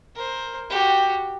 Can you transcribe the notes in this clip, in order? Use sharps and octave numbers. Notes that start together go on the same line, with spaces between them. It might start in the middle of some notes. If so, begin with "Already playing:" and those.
A#4 C5
F#4 G4